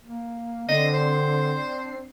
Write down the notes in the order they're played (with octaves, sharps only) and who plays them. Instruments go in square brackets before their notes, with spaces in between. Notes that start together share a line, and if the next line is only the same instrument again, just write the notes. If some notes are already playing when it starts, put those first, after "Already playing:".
[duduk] A#3
[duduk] D3 [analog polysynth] C4 D4 C7 [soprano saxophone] D#5
[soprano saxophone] C5